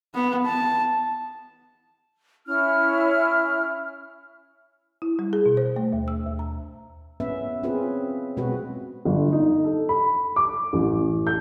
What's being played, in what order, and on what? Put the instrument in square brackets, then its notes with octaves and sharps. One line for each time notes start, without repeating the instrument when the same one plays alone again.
[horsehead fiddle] B3
A5
[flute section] C#4 E4 F6
[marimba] E4
G3
G#4
B2
C5
A3
D#2
E6
D#2
A#5
[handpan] B3 C#4 B4 E5
C4 C#4 F4 G#4 B4
B2 G#3 C4 F#4 B4
[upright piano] G1
D#4
A4
B5
D6
A1
G6